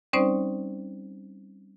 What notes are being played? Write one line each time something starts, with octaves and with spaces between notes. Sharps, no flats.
G3 C4 C#4 D#4 C5 D5